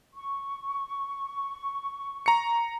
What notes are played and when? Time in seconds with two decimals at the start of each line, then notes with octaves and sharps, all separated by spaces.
0.13 C#6
2.26 A#5 C#7